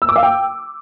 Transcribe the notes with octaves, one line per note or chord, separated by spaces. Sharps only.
E6
D6
F5
G5